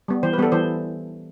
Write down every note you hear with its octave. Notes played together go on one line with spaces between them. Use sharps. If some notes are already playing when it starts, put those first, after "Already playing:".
G3 B3
E3 C5
B4
G3 B3 A4
E3 C5